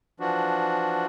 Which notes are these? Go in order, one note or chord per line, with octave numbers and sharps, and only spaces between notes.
E3 F3 D4 F#4